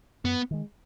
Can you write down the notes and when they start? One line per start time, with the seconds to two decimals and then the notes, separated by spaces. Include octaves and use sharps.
0.24 F#2 B3
0.51 D#3 G#3